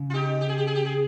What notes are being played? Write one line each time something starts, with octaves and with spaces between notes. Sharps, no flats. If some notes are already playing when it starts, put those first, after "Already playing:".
Already playing: C#3
F4
D#4 G4
G4
G#4
G4
G#4
G4
G#4